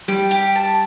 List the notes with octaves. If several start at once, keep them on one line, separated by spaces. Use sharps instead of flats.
G3 G4
G4
A5